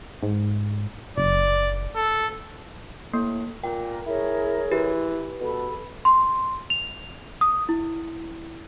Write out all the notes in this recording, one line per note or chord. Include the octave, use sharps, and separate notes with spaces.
G#2
F#1 D5
A4
A2 A#3
A#2 A#4 G5
E4 G#4 A#4 C#5
E3 G4
B2 A4 B5
C6
F7
D#6
E4